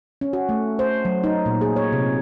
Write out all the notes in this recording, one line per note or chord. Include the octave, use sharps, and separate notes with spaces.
C#4
F#4
A3
C5
F#3
D#4
A#2
G#4
C#5
C3